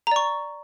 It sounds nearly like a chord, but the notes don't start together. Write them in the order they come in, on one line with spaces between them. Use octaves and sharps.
A#5 D5 C#6